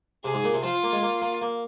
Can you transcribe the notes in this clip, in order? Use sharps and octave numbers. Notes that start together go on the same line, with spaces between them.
C3 G#4
G#2
A#2
C3
F3 F4
A#3
G#3
A#3
A#3
A#3